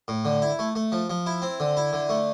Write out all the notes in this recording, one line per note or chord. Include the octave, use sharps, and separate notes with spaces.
A2
D3
E4
A3
A3
F3
F3
E4
C4
D3
E4
D3
A3